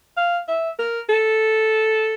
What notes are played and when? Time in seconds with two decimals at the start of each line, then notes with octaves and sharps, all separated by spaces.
0.17 F5
0.48 E5
0.79 A#4
1.09 A4